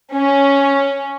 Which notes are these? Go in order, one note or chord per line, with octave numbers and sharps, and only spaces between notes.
C#4